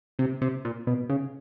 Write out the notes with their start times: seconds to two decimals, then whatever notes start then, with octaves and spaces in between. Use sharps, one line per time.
0.19 C3
0.41 C3
0.65 A#2
0.87 B2
1.10 C#3